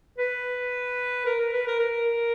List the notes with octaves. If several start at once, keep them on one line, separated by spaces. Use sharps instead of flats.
B4
A#4
A#4
B4
A#4
A#4